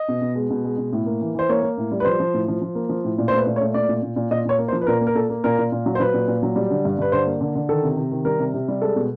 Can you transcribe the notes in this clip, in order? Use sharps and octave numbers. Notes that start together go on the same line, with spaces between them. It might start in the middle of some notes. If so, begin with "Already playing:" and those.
Already playing: D#5
B2
B2
G#3
B2
G#3
B2
A2
A#3
E3
E3 C5
A#3 C#5
A#3
A2
G3
B4
F3 C5
F3
A2
F3
F3
A#3
F3
A2
A#2
C5
A3 B4
A#2
C#5
A3
A#2 D5
A#2
A#2
A#2
A#2 D#5
A#2 C#5
A#3
C5
F3
B4
A#2 A#4
A#3
A#4
A#2 A4
A#3
A#2 A#4
A#2
A#2
F#3
C5
F#3 B4
A#2
A#2
F#3
G3
D3
G2
G2 B4
D3 C5
A#3
D3
D3
D#3 A4
C3
C3
D#3
G3 A#4
C3
C3
G3
G#3 A4
B2